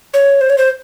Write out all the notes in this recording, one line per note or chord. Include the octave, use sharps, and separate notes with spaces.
C#5
C5
C#5
C5